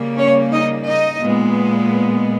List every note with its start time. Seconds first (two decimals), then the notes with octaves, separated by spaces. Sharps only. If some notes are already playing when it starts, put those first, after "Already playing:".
Already playing: C#3 G3 A#3
0.17 C#4 C#5
0.51 D#4 D#5
0.87 D#4 D#5
1.22 A#2 G#3 B3